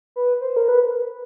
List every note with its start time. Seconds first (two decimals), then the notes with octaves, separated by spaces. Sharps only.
0.16 B4
0.41 C5
0.56 A#4
0.68 B4